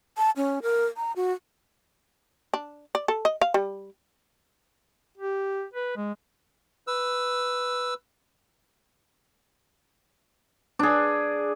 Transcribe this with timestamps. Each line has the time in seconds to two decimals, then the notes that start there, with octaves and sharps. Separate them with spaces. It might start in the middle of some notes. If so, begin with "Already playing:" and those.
0.18 A5
0.36 C#4
0.62 A#4
0.97 A#5
1.16 F#4
2.54 D4
2.95 D5
3.08 A4
3.25 D#5
3.41 F5
3.54 G3
5.18 G4
5.74 B4
5.97 G#3
6.87 B4 E6
10.79 D4 G#4